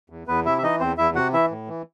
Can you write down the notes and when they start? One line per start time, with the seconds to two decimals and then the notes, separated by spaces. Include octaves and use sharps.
0.10 E2
0.27 E2 B3 B4
0.45 C3 E4 E5
0.58 E5
0.62 E3 D#4 D#5
0.80 E2 C4 C5
0.98 E2 E4 E5
1.15 C3 F#4 F#5
1.33 E3 E4 E5
1.51 A2
1.68 E3